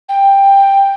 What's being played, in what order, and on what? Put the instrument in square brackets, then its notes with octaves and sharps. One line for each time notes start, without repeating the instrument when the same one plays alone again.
[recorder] G5